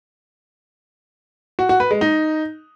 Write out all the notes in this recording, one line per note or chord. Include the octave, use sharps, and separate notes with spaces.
F#4
F#4
B4
G#3
D#4